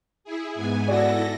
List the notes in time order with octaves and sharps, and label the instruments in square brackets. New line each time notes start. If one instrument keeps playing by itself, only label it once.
[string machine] E4 G#4
G#2 B3 G#5
[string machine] E4 A4 A#6 [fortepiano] F#4 D5